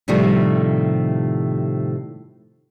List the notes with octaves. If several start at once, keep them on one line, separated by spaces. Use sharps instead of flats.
A2 C3 D#3 F3 G3 A3